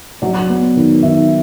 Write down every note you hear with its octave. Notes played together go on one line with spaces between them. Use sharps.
F#3 D5
B3
D#3
D#3 E5